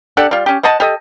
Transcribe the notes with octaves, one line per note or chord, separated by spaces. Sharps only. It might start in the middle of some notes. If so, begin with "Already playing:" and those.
D4 G4 A4 F#5
G3 F4
C#4 G4
C5 D#5 F#5 A5
G4 A4 D#5